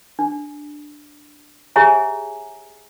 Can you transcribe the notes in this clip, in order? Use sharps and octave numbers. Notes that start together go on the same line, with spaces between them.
D4
G4 G#4 C#5 E5 G#5 A#5